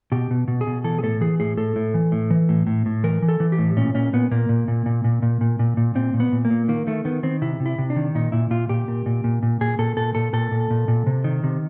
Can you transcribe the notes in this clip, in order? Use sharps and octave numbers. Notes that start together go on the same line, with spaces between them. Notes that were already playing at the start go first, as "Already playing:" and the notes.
B2 G4
B2
B2
G#4
B2
E3 A4
G#4
A2 A4
E3 G#4
A2 G#4
A2 A4
A2
E3
A2
E3
A2
A2
A2
E3 A#4
E3
A4
E3
G4
A2
A#2 C#4
A#2 C#4
A#2 B3
A#2 A#3
A#2
A#2
A#2
A#2
A#2
A#2
A#2
A#2
A#2 C4
A#2
B3
A#2
A#3
A#2
D#3 A#3
D#3 A3
D#3 B3
D#3 C4
C3 E4
C3
E4
C3
D4
D#3
A#2 D#4
A#2 E4
A#2 F4
A#2 G4
A#2
A#2
A#2
A#2
A#2 G#4
A#2 A4
A#2 A4
A#2 A4
A#2 A4
A#2
A#2
A#2
C3
D#3
C3